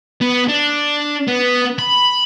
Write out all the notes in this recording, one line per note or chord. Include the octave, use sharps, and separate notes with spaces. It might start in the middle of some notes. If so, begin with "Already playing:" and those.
B3
D4
B3
B5